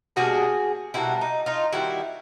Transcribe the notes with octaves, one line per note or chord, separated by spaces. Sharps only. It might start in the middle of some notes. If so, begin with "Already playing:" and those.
B2 G3 A#3 D4 F#4 G#4
B2 G3 A#3 D4 E4 F#4
D#4
D#4 F4
D#3 G3 C4 E4 F#4